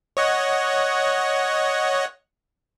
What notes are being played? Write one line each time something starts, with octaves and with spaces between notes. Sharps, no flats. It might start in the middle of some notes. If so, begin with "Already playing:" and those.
C#5 D#5 F#5